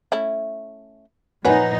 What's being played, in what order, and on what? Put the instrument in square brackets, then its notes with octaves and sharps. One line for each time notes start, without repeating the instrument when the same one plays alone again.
[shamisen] A3 C#4 E4
[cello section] A#2 F3 D#4 [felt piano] B4 F#5 G#5 [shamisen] C#5